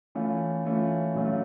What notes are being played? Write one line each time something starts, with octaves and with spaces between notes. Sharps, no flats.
E3 A3 C#4 F4
E3 A3 C#4 F4
A#2 F#3 A3 C#4 F4